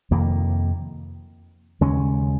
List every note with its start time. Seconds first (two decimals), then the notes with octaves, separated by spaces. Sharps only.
0.11 F2 C3 D#3 A#3
1.81 D#2 C#3 G#3 C#4